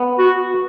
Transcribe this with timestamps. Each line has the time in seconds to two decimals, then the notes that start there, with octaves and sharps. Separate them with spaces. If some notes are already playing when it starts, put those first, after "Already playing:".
Already playing: B3
0.19 F#4